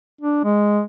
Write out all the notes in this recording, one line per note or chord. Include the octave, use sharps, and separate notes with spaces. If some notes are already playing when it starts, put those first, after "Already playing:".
D4
G#3